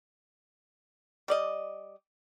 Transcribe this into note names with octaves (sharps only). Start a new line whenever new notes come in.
G3 D5 D#5